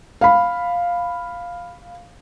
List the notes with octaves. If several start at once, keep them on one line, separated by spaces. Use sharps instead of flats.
F5 B5